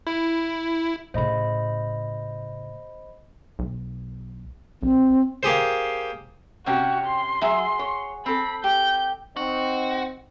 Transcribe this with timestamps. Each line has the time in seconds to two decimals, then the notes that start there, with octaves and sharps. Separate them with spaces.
0.07 E4
1.14 A2 C#3 C5 D#5 B5
3.59 B1
4.83 B1 C4
5.43 A#3 G4 G#4 C5
6.66 C3 C#4 F#4 G4 C#5 E5
7.07 C6
7.41 F#3 F#4 G#4 E5
7.79 C#5
8.26 C4 A4 B5
8.64 G4 G6
9.37 C4 D#4 F#4